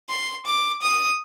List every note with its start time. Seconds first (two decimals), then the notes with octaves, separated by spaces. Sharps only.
0.09 C6
0.46 D6
0.82 D#6